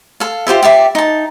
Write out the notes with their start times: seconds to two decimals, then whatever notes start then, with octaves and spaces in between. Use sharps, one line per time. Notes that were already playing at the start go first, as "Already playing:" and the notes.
0.20 A4 F5
0.47 F4 G4 C5 E5
0.63 G4 D5 E5 D6
0.95 D#4 A5